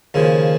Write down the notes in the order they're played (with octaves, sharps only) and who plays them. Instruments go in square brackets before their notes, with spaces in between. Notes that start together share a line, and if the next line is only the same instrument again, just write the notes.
[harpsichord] D#2 C#3 F3